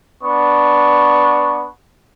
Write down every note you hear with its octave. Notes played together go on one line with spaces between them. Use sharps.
B3 D4 C#6